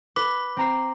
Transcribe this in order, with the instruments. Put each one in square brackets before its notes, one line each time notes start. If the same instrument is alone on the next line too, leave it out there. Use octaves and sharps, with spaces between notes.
[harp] B4 [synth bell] D6
[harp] C4 A#5 C7